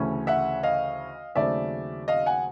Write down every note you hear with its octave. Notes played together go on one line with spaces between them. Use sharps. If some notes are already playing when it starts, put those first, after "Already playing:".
Already playing: D2 C#3 E3 A3 C#4
E5 F#5
D#5 F5
D#2 C#3 F#3 A3 C4 D5 E5
D#5 F5
F#5 G#5